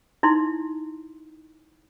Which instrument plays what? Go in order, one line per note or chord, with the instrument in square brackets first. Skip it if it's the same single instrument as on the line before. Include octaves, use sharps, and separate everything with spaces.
[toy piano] D#4 E4 C6